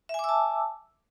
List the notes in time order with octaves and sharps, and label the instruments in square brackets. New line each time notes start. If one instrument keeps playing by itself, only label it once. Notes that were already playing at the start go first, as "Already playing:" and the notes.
[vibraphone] E5
G#5
D6
E6
A5